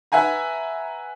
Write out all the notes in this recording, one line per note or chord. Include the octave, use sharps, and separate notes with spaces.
B4 E5 F#5 G#5 A#5